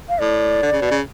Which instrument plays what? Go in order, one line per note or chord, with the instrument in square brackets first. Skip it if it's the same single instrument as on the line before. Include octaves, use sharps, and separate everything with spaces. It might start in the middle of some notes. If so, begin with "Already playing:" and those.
[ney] F5
[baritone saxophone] A2 [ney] D5
[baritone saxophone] D3
C#3
B2
C#3